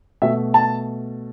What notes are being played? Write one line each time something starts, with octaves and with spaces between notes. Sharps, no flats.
B2 A3 E5
A5